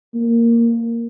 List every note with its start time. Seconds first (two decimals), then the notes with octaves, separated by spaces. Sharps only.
0.14 A#3